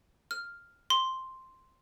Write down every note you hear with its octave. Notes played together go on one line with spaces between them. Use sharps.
F6
C6